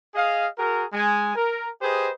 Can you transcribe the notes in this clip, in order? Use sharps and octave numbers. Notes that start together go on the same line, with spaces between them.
G#4 D#5 F5
F#4 G#4 A#4
G#3 G#5
A#4
G4 G#4 B4 C5 D#5